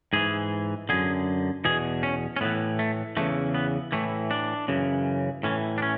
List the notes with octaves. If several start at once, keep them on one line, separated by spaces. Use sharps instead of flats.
G#2 E3 G#4
F#2 D3 G#4
E2 B2 G#4
C#4
C#4
A2 E3 B3
A3
E2 C#3 E3 A3
B3
A2 E3 A3
D4
F#2 C#3 E3
A2 E3 C#4
D4
C#4